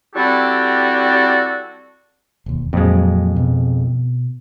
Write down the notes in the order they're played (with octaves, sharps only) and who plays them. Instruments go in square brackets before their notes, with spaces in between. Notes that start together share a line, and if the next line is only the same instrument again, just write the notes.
[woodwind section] G3 C4 E4 F#4 G4 A4
[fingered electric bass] E1 D#2
[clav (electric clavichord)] F2 G#3 [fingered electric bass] A#2 F#3
[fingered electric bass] B2